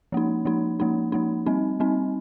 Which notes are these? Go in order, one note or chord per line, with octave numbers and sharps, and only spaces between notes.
F3 A#3 D#4
F3 A#3 D#4
F3 A#3 D#4
F3 A#3 D#4
G3 C4 D#4
G3 C4 D#4